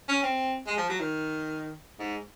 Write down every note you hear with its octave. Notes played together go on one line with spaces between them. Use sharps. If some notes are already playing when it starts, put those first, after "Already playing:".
C#4
C4
G#3
F3
F#3
D#3
G#2